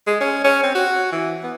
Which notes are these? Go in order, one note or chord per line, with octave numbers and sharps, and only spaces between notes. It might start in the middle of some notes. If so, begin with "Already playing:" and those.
G#3
C#4
C#4
C4
F#4
E3
B3